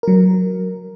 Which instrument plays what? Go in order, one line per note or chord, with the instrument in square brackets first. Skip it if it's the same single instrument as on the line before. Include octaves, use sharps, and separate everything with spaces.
[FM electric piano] F#3 A#4